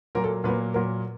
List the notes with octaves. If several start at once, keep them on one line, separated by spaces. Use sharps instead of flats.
A#2 F#3 A#3 A#4
A4
A#2 F#3 A#3 B4
A#2 F#3 A#3 A#4